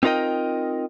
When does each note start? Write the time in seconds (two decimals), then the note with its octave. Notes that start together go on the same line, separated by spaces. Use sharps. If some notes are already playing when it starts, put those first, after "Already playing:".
0.03 C4 D#4 F4 A#4 D#5 G5